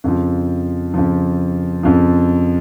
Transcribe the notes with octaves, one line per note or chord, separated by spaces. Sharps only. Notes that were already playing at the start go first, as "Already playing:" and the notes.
F2 C#3 F3
F2 C#3 F3
F2 C#3 F3